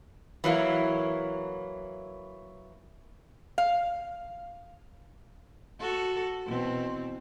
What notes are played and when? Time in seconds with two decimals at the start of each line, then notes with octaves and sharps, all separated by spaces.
0.44 E3 F#3 A#3 E4
3.58 F5
5.79 F#4 A4
6.45 B2 E3 C4